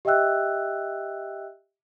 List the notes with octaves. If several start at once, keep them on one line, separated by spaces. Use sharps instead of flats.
G4 D#5 E5 G5 E6 F#6